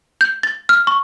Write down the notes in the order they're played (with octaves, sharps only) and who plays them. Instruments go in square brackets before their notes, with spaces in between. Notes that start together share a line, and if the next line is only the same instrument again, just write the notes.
[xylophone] G6
A6
F6
C#6